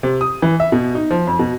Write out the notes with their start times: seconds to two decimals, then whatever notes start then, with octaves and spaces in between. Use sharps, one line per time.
0.03 C3
0.21 D#6
0.42 E3
0.60 E5
0.72 B2
0.95 D#4
1.11 F3
1.27 F2
1.39 B2